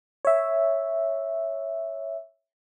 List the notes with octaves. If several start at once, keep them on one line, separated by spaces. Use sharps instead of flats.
C#5 E5